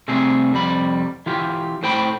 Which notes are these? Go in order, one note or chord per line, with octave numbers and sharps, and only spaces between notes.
C3 G3 A3 C4 G#4
F2 C3 G3 B5
E3 F4 G4
A2 C5 G5 B5